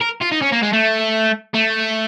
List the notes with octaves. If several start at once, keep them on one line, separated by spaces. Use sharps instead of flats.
A#4
F4
D#4
C#4
A#3
G#3
A3
A3